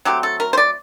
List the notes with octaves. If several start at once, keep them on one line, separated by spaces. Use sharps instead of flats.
F#3 A3 C4 G4
A4
A#4
C5
D5